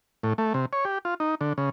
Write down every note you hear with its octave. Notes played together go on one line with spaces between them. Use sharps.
A2
A3
C3
C#5
G4
F4
D#4
D3
C#3